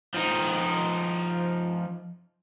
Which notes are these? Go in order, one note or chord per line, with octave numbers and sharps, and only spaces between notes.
F3 D#4